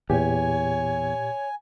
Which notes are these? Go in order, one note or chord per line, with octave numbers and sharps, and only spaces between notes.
E2 A#2 G4 C#5 G#5